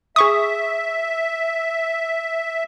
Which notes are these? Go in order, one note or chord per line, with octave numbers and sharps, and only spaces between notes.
G#4 E5 C#6 D#6